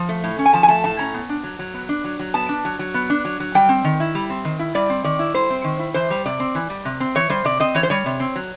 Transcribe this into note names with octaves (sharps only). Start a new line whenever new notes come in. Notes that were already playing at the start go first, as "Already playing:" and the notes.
Already playing: F3
A3
A2
C#4
G#5
F3 A5
G#5
A3 A5
A2 A5
C#4 A#5
B3
D4
F#3
F#3
B3
D4
F#3
F#3
B3 A5
D4
F#3
F#3
B3
D4
F#3
F#3
G3 G5
C4
D#3
E4
G3
C4
D#3
E4
G3 D5
C4
D#3 D5
E4
G3 C5
C4
D#3
E4
E3 C5
G3
C3 D5
C4
E3
G3
C3
C4
E3 C#5
G3 C5
C3 D5
C4 D#5
E3 C#5
C5
G3 C#5
C3
C4
F#3